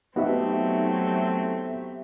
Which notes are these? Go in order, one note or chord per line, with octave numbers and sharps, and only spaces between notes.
F#3 A3 B3 C4 D#4 F#4 G4 E5